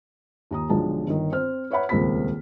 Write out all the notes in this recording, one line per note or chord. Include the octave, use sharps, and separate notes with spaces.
D#2 A#5 D#6
B1 D3 F3 G#3 A5
G1 D#3
C4 C5 F6
B4 C#5 E5 F#5 B5
D#1 C#2 A#3 C4 B5 B6